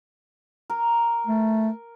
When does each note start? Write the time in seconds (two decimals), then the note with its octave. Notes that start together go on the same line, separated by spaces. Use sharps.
0.70 A#4
1.27 A3